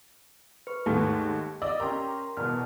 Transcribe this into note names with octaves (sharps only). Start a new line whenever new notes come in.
B4 C#6
D#2 G#2 A3 G4
D5 D#5 E6
C#4 G4 A#4 A#5 C6
E2 B2 F6